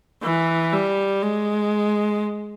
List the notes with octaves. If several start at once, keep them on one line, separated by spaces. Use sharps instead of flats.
E3
G3
G#3